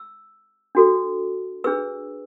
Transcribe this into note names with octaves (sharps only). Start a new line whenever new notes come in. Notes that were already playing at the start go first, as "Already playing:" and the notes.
Already playing: E6
D4 F#4 A4
D4 G#4 B4 E6